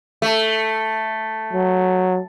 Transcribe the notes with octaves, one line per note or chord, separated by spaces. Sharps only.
A3
F#3